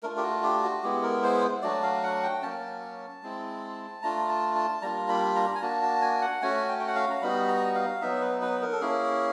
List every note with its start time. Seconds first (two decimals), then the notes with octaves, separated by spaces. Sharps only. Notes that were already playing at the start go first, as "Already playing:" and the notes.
0.03 A3 D4 F4 A#4
0.17 G4
0.23 F#4
0.43 G4
0.63 F#4
0.83 G#3 B3 E4 G4
1.03 A#4
1.23 C5
1.62 F#3 A3 D4 F#4 D5
1.83 F5
2.03 F#5
2.23 G5
2.42 F#3 A#3 C#4 A5
3.23 G#3 C4 E4
4.03 A3 D4 F4 A#5
4.29 A5
4.56 A5
4.82 G3 A#3 D4 F4 A#5
5.09 B5
5.36 A#5
5.55 G#5
5.62 A#3 D4 F#4 A5
5.83 A5
6.01 G#5
6.22 F#5
6.42 A3 C#4 F#4 G#5
6.69 G5
6.79 G5
6.87 F#5
6.95 F5
7.10 A#5
7.21 G3 B3 D#4 F#4 B5
7.48 A#5
7.75 F5
8.01 F#3 B3 D#4 E5
8.21 B4
8.42 B4
8.62 A#4
8.72 A4
8.81 A#3 C#4 E4 G#4